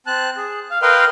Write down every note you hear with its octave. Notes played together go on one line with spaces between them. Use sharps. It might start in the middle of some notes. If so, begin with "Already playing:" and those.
C4 A5 F#6
G#4
F5
A#4 B4 D#5 F5 G5 C6